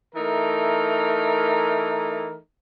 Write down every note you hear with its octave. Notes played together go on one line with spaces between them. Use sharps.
E3 A3 D#4 A#4